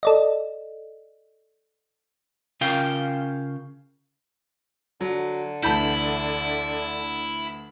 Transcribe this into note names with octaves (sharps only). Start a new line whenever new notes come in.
A4 D5 D#5
C#3 F4 A#4 F5 G5
D3 F#3
D2 E3 E4 A5 B5 G6